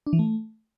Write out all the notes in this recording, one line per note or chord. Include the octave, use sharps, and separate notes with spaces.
D4
E3
A3